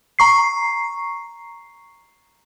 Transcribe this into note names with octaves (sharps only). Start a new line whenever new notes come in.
A#5 C#6 C7